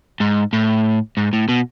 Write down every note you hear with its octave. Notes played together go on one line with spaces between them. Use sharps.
G#2
A2
G#2
A2
B2